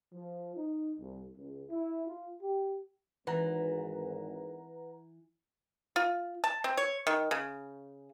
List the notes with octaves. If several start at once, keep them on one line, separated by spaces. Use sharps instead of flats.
F3
D#4
C2
C#2
E4
F4
G4
G#1 E3 B4 F#5 A#5
F4
A5
C4
C#5
D#3
C#3